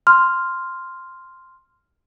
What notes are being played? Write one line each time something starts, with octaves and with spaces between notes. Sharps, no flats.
C6 F6